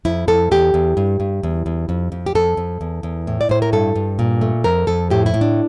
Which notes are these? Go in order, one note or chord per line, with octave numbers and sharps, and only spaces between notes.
F2 E4
F2 A4
E2 G4
E2
G2
G2
E2
E2
F2
F2
G4
F2 A4
F2
E2
E2
A2
D5
A2 C5
A#4
G2 A4
G2
A#2
A3
F2 A#4
F2 A4
A2 G4
E4
A2
D4